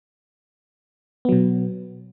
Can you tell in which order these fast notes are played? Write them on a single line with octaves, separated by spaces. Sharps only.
B3 F#3 B2